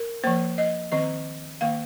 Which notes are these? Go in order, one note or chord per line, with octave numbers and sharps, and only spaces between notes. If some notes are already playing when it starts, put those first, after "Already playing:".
Already playing: A#4
F3 A#3 C5
D#5
D#3 C4 D#5
D#3 A#3 F5